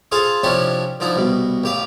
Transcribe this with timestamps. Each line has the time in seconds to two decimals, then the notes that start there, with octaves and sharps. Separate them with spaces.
0.12 F4 G#4 A4 C5 F5
0.43 C3 F3 C#4 D4 E4 G4
1.00 D3 F3 D#4 E4
1.16 C2 B2
1.64 A1 G4 F5